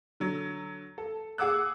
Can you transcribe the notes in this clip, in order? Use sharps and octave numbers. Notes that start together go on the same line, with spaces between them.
D3 F#3
A4
G#4 F#5 D6 E6 F#6